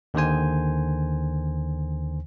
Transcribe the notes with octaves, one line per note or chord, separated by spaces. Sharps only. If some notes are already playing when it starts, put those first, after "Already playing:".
D#2 D3 D#3 C5 G#5